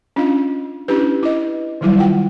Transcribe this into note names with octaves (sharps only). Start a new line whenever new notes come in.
C#4 D4 F4 D#5 F5
C#4 D4 E4 G4 B4
E4 B4 D#5
D#3 F#3 G3 E4
F4 F#5 G5